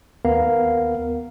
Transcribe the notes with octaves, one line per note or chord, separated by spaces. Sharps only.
D#2 B3 A#4 F5